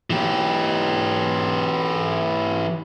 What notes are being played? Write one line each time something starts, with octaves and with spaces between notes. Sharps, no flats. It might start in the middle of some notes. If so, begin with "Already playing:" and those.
E3 G4